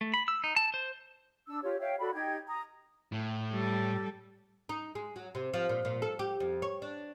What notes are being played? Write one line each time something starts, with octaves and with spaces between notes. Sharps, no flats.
A3
B5
E6
D#4
A5
C5
D4 E6
F4 G4 C#5
C#5 E5 F5 G5
F#4 A4 D5 B5
D#4 G4 G5 G#6
A#5 D#6
A2
G3 A4
D#4
G#3
F#3
C3
F3
A#2
A#2
A4
G4
F2
C#5
D4